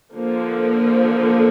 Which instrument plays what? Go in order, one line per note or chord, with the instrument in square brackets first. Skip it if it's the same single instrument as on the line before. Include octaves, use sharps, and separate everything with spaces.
[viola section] D3 F3 A#3